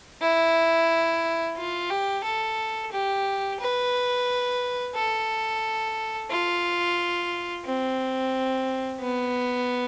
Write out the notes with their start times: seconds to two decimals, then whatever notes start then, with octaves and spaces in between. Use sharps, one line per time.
0.22 E4
1.57 F4
1.90 G4
2.24 A4
2.92 G4
3.60 B4
4.94 A4
6.30 F4
7.66 C4
9.01 B3